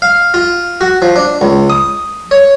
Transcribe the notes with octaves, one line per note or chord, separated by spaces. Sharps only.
F5
F4
F#4
F3
D4
C#2
D#6
C#5